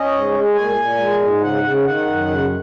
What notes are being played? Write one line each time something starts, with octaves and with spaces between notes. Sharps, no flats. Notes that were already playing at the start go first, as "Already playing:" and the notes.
Already playing: C#4 D#5
G#2
G#3
A#2 G#5
A#2
G#3
G#2
C#3 F#5
C#3
D#3 F#5
F#2
C#3